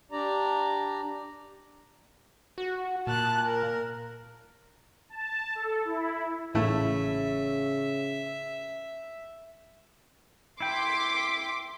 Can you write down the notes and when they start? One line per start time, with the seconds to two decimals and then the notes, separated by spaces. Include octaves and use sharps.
0.12 D4 G4 D5 A#5
2.58 F#4
3.07 A#2 A5 F#6
3.46 A#4
5.10 A5
5.55 A4
5.85 E4
6.55 A1 C#3 A3 E4 E5
10.60 E4 G5 C6 D6 B6